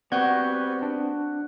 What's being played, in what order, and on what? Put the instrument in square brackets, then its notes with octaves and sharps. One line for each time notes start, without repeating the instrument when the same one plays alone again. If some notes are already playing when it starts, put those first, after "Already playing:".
[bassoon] G3 [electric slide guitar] B3 C4 [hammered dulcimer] F#4 [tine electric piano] C#6 G6 G#6
[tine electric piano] D4